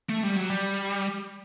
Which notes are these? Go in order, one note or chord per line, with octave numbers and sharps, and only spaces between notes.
A3
G3
F#3
G3